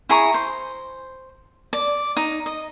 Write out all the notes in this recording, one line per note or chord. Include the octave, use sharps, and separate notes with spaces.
E4 G#4 A#5 C#6
C5
D5
D#4
D#5